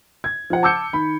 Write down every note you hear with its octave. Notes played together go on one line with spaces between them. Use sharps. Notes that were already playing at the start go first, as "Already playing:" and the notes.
G#6
F3 F#5
A5 D6 E6 G6 C#7
D#3 B5